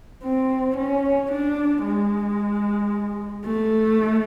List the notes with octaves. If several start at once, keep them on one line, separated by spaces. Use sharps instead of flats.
C4
C#4
D4
G#3
A3